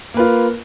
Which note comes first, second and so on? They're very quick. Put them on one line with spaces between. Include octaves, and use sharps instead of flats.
A#3 B4 F4